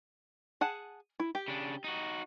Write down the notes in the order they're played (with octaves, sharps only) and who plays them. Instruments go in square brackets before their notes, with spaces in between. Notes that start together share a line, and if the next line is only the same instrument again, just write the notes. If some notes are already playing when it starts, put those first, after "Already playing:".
[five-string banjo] G#4 F#5 A5
E4
G4
[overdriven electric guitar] C#3 D4
D#4 F#4